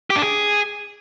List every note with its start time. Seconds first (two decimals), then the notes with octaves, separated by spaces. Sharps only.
0.10 G4
0.16 D4
0.22 G#4